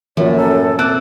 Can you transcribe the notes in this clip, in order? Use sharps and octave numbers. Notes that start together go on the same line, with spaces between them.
F#2 A2 F3 A#3 D5
C#4 A4 A#5
C4 D5 F#6